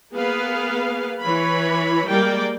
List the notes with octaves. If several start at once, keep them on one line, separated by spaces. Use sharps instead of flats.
A#3 B3 G#4 B4 F5
E3 B4 C#5 B5
G3 G#3 A#3 A#4 D5 G5